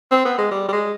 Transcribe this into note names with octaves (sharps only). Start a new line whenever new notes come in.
C4
B3
G#3
G3
G3
G#3